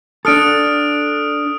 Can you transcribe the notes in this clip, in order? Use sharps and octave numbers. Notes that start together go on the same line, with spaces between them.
D4 A4 D#6 F6 D7